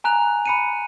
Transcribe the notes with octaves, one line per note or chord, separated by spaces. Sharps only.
G#5 A#5 F#6 F7
B5 C#7 D#7